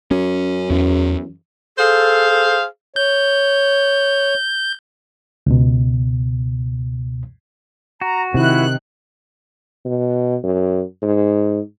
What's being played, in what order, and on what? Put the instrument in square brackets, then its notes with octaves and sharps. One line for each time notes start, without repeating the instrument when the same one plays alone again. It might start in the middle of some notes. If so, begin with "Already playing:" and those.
[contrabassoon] F#2 [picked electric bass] C#4
[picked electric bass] E2
[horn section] G#4 C5 F5 [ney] A4
[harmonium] C#5 [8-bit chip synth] G6
[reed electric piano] C#2 B2
[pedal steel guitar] F#4 [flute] A#5
[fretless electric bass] C3 [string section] D#3 F#6 [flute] E4
[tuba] B2
F#2
G#2